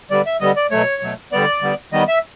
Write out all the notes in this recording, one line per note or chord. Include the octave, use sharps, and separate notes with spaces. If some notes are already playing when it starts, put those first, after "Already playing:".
D3 G3 B3 D5
E5
D3 G3 B3 D#5
D5
B2 F#3 A3 C#5
B2 F#3 A3
D3 G3 B3 D5
D3 G3 B3
D#3 G3 B3 D#5
E5